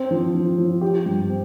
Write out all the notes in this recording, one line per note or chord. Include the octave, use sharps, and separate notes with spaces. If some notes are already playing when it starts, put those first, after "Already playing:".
Already playing: C4
F3
F3
F3
G4
G2
C4